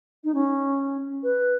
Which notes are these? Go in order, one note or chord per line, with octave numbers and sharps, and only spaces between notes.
D#4
C#4
B4